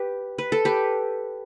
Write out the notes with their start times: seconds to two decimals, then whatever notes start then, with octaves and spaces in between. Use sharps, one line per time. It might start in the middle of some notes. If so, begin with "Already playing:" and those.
Already playing: G4 B4
0.38 B4
0.52 A4
0.65 G4 B4